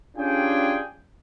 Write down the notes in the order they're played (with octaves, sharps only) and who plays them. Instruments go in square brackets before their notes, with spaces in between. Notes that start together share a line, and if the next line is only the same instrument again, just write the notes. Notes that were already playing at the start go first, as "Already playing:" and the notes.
[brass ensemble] C#4 D4 F4 G4 G#4 G5